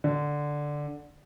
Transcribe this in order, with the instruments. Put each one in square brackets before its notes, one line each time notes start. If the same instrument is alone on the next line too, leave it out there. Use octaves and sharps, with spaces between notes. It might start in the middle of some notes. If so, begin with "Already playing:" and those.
[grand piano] D3